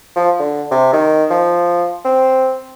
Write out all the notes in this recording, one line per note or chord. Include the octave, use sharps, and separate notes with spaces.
F3
D3
C3
D#3
F3
C4